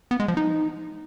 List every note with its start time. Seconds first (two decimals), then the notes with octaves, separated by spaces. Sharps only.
0.11 B3
0.20 G#3
0.28 F3
0.37 D#4